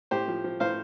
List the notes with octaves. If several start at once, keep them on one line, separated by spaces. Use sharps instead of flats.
A2 G4 C5
F3
F3
A2 C5 F5